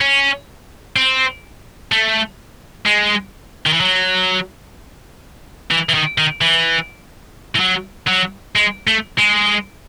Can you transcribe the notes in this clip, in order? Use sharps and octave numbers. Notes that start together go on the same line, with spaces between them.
C#4
C4
A3
G#3
D#3
E3
F#3
E3
E3
D#3
D#3
E3
E3
F#3
F#3
G#3
A3
G#3